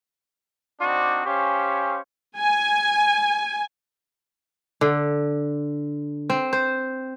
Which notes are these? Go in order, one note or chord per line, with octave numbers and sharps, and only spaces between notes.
C4 D4 D#4 F#4 C5 D5
C#4 G4 C5 F5 G#5 C#6
G#5
D3
C4
C5